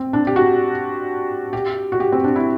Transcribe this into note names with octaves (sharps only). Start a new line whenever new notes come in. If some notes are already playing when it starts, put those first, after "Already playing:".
Already playing: C4
D4
G4
F#4
G4
F#4
G4
C4
D4
E4